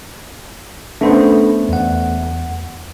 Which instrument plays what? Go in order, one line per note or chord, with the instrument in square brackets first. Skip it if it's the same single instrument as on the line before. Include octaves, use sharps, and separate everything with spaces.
[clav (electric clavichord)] A3 B3 C5 [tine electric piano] C#4 D4 A4
[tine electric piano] E2 F#5